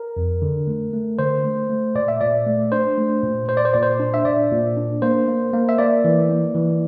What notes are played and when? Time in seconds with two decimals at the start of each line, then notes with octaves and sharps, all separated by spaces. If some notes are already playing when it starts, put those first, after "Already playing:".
Already playing: A#4
0.17 F2
0.42 D3
0.67 A3
0.93 A3
1.19 D3 C5
1.44 A3
1.70 A3
1.95 A#2 D5
2.08 E5
2.21 A#2 D5
2.47 A3
2.72 D4 C5
2.98 A3
3.23 A#2
3.49 A#2 C5
3.57 D5
3.65 C5
3.74 A#2 D5
3.83 C5
4.00 D4
4.14 E5
4.25 A#2 D5
4.51 A#2
4.77 D4
5.02 A#3 C5
5.28 A#3
5.53 A#3
5.69 E5
5.78 A#3 D5
6.04 E3
6.30 A#3
6.55 E3